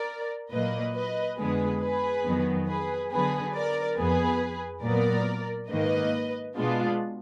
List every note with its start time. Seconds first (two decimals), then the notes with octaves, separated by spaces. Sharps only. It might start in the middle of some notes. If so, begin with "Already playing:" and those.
Already playing: A#4 D5
0.51 A#2 F#3 A#3 B4 D#5
0.95 B4 D#5
1.38 F2 D3 G#3 B3 G#4 B4
1.81 G#4 B4
2.25 F2 D#3 F#3 B3
2.68 G#4 B4
3.11 D3 F#3 B3 G#4 B4
3.54 A#4 D5
3.97 F2 F3 B3 G#4 B4
4.84 A#2 F#3 B3 A#4 D5
5.70 G#2 D#3 A#3 B4 D#5
6.56 B2 G#3 B3 D4 F4